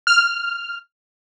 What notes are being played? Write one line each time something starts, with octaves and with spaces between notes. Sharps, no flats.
F6